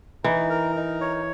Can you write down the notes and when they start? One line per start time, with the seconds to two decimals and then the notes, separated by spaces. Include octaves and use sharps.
0.24 E3 D#4
0.50 A#4
0.76 D#4
1.01 C#5